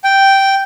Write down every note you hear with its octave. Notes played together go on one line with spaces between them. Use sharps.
G5